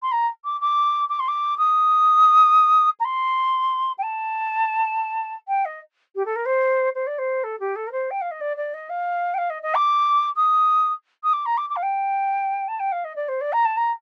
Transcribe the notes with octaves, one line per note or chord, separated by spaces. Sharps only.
C6
A#5
D6
D6
D6
C6
D6
D#6
A#5
C6
G5
A5
G5
D#5
G4
A4
A#4
C5
C5
D5
C5
A4
G4
A4
A#4
C5
G5
F5
D#5
D5
D5
D#5
F5
G5
F5
D#5
D#5
D6
D#6
D#6
D6
A#5
D6
D6
F5
G5
A5
G5
F5
D#5
D5
C5
D5
A#5
A5
A#5